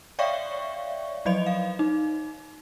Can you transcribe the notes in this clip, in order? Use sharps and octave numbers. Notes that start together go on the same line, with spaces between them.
C#5 D5 E5 F5 G5 C#6
F3 F#3 D5 D#5 F7
F5
D#4